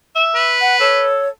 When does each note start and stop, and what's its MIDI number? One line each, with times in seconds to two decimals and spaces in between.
0.15 0.56 76
0.35 1.09 71
0.61 0.79 78
0.80 1.29 69
0.80 1.29 73